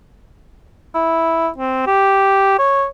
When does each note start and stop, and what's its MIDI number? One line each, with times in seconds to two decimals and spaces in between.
0.94 1.48 64
1.58 1.84 60
1.86 2.58 67
2.58 2.85 73